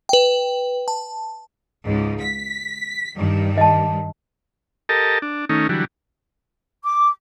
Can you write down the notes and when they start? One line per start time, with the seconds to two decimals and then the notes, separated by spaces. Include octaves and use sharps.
0.09 B4 G5
0.88 A5
1.86 C#2 G#2
2.21 B6
3.17 G2 D#3
3.58 D#5 A5
4.89 G4 A4 A#4 D#5 A5
5.22 D4
5.49 D#3 A3 C#4 D#4
5.69 D3 E3 F#3 G3
6.83 D6